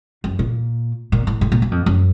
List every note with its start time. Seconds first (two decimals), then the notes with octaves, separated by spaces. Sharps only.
0.24 F#2
0.39 A#2
1.12 A#2
1.27 A2
1.41 A2
1.52 A#2
1.62 F#2
1.71 F2
1.86 F#2